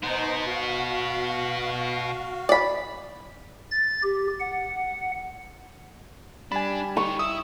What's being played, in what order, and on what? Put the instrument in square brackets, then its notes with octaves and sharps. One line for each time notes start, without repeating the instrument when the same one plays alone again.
[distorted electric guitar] B2 B3 [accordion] D#4 C5
[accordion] F#4 F5
[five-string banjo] D5 B5
[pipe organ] A6
G4
F#5
[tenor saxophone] G3 [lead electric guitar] D4 [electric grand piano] G#5 B5
[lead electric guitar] D#4 G4 [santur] C#6
[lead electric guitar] E4 [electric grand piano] D#6